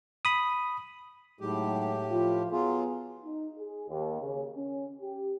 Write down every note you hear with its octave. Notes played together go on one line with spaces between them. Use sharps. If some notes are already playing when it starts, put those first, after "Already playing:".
B5 D#6
A2 F#3 G#3 D#4 G4
F3 F4
F#3 B3 F4 G#4
D#4
G#4
D#2
C#3
C#4
G4